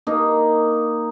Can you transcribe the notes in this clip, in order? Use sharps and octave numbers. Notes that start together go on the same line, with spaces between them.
A#3 D#4